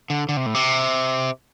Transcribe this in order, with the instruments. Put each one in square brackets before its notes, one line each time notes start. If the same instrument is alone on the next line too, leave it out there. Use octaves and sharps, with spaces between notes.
[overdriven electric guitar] D3
D3
C3
A2
C3